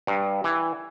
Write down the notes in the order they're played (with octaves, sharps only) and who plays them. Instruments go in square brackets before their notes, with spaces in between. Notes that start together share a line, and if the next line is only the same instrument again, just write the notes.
[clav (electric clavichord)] G2
E3